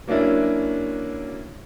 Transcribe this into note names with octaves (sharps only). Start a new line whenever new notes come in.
F#3 A#3 C#4 D4 E4